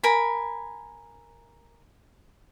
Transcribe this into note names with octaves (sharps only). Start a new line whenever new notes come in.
A#4 G#5 B5